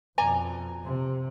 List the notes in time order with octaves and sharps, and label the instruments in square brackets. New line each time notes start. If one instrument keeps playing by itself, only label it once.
[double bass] F2 B2 [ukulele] D5 G#5 A#5
[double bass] C3